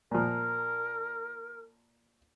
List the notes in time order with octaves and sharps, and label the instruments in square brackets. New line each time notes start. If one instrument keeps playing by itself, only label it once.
[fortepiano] A#2 F3 [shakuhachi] A#4